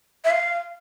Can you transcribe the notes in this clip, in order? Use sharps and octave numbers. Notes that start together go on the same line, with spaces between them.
E5
F5